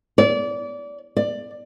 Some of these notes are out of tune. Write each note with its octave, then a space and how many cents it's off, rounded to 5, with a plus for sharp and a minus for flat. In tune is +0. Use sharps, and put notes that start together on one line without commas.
D5 -25
D5 +15